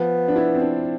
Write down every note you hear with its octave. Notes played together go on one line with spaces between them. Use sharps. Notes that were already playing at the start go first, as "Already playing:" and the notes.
Already playing: F3 B3
D4
E4
C4
D4